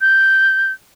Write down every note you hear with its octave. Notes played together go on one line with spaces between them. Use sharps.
G6